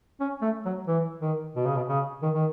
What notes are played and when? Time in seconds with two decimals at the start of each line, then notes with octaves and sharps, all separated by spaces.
0.20 C#4
0.42 A3
0.65 F#3
0.87 E3
1.21 D#3
1.55 B2
1.65 C#3
1.76 B2
1.89 C#3
2.22 D#3
2.34 D#3